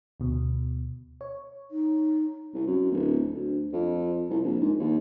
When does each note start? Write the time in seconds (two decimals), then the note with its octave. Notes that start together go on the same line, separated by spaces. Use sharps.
0.20 D2 B2
1.21 C#5
1.71 D#4
2.54 C2
2.66 F#2
2.92 D1
3.34 D2
3.73 F2
4.30 C2
4.44 A#1
4.60 G#2
4.79 D#2